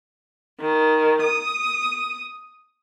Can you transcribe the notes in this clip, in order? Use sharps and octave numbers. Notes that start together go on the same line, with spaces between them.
D#3
D#6